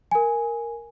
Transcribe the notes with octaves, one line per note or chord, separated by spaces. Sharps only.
A#4 G#5